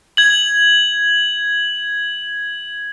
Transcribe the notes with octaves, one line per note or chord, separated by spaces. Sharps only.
G#6 F#7